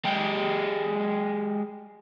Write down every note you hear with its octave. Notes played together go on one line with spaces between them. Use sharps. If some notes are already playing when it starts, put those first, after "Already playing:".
G#3 G4